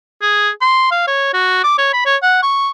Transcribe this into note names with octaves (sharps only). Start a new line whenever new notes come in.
G#4
C6
F5
C#5
F#4
D6
C#5
B5
C#5
F#5
C#6